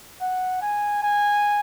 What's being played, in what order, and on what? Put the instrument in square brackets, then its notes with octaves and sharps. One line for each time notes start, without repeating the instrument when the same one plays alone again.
[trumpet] F#5
G#5
G#5